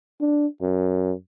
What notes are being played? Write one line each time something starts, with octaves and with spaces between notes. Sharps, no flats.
D4
F#2